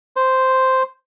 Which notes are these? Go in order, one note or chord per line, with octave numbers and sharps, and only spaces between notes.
C5